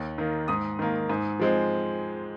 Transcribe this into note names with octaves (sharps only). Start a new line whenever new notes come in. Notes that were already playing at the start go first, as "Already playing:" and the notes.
Already playing: D#2
D#3 A#3
G#2 D#6
D#3 A#3
G#2
F3 G#3 C4